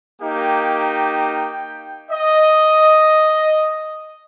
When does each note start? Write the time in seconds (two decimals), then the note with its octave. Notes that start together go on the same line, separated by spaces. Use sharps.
0.21 A#3 D#4 G4 G5
2.11 D#5